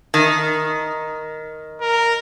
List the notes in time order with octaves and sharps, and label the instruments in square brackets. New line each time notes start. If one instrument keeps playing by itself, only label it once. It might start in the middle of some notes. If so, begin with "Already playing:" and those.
[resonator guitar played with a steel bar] D#3
[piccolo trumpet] A#4